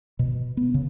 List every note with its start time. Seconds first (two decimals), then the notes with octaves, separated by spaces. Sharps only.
0.19 B2
0.57 B3
0.74 C#3